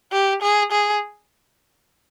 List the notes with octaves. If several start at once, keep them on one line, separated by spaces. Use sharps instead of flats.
G4
G#4
G#4